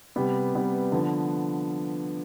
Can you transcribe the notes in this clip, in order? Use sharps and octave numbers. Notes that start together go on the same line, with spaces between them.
C3 G3 B3
C3 G3 B3
D3 F3 B3